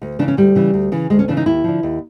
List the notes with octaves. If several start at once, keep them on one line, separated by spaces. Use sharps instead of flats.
D2
C#3 E3 D4
C#4
D2 G3
C#3 E3
D2
C#3 E3
D2 G#3
C#4
C#3 E3 D4
D#4
D#2 E4
D3 F3
D#2